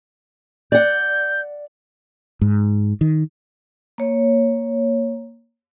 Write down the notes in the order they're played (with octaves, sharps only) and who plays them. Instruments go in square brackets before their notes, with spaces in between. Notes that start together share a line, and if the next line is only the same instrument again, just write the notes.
[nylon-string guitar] D5 F#5 [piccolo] G6
[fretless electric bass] G#2
D#3
[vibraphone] A#3 C#5